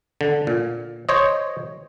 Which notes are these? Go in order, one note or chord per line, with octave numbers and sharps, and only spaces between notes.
D3
A#2
C5 C#5 D#5